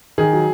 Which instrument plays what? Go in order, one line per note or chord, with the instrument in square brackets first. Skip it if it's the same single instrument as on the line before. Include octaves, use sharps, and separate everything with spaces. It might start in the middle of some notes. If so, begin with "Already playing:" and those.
[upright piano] D#3 G#4
F#3